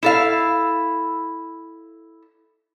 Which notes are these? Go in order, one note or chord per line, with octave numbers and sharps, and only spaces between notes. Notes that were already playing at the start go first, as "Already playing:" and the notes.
E4 A4 F5